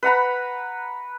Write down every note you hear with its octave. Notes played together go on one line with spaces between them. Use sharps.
B4 F#5 A#5 B5